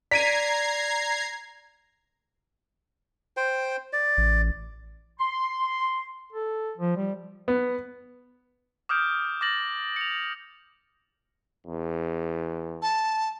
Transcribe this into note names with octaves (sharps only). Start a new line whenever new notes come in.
D5 A#5 G#6 B6 C7 D7 D#7
C5 G5
D5
A1
C6
A4
F3
G3
B3
D6 D#6 F6 G6 D7
D6 F6 A6 A#6 F#7
C#7 F7
E2
A5